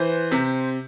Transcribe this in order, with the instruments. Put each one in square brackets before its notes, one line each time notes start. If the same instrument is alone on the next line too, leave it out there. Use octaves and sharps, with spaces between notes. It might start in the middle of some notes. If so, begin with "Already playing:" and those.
Already playing: [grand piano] E3 C5
C3